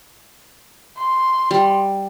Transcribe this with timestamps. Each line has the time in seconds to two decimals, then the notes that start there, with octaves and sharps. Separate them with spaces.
0.97 C6
1.51 G3